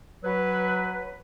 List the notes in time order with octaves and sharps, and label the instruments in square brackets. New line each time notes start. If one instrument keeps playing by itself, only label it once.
[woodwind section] F#3 B4